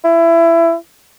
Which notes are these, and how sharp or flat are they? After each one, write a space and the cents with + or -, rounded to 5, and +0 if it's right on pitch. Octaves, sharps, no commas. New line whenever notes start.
E4 +20